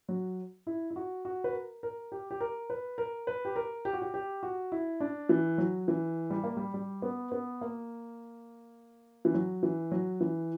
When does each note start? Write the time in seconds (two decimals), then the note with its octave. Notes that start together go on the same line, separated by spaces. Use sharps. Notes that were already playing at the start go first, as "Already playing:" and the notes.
0.09 F#3
0.67 E4
0.91 E4
0.96 F#4
1.25 F#4
1.44 B4
1.53 A#4
1.83 A#4
2.12 G4
2.31 G4
2.41 A#4
2.70 B4
2.98 A#4
3.27 B4
3.45 G4
3.56 A#4
3.85 G4
3.93 F#4
4.02 G4
4.14 G4
4.43 F#4
4.72 E4
5.00 D4
5.29 E3
5.58 F#3
5.88 E3
6.30 G3
6.44 A#3
6.57 G3
6.74 G3
7.02 B3
7.32 B3
7.61 A#3
9.25 E3
9.34 F#3
9.63 E3
9.92 F#3
10.21 E3